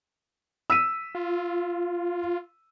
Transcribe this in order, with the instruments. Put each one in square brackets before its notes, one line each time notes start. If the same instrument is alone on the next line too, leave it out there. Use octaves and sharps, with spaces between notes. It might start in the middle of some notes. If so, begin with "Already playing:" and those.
[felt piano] E6 B6 D#7
[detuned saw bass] F4